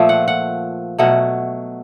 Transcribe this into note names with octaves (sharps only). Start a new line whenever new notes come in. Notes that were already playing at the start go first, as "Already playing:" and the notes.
Already playing: A#2 F3 A3
F#5
F#5
B2 F#3 A3 F#5